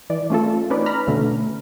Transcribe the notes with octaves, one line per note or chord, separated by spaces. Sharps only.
E3 D5
A3 C#4 F4 A4
C#4 D#4 B4 D5
A#5 B5 F6
B2 D3 A3 C#4